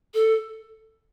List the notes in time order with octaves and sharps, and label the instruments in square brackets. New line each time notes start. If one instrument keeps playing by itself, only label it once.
[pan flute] A4